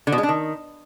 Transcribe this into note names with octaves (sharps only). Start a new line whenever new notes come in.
D3
B2
G#3
D4
D#3